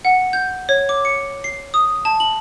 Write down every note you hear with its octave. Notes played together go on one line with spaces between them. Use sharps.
F#5
G6
C#5
D6
C#7
C7
D#6
A5
F#7